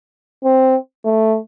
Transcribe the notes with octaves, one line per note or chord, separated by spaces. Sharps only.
C4
A3